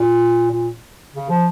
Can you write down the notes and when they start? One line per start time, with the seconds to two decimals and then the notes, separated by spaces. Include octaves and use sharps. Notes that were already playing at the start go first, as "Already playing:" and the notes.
Already playing: A#2
0.51 A#2
1.15 C#3
1.30 F3